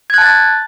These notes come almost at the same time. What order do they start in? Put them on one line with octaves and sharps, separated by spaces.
G#6 F#6 A5 A6